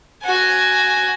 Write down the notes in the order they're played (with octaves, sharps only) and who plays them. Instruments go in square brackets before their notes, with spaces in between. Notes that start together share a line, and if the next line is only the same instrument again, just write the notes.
[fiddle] F#4 G#5